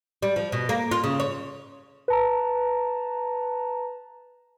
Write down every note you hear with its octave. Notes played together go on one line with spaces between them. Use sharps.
G3
F3
B2
A#3
F4
C#3
C#5
B4 A5 A#5